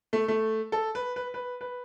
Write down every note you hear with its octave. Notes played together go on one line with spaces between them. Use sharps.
A3
A3
A4
B4
B4
B4
B4